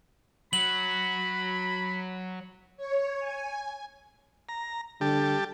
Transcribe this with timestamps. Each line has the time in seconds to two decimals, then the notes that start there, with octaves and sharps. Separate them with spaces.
0.53 F#3 B5 F#7
2.77 C#5
3.20 G#5
4.49 A#5
5.01 D3 G3 G4 A5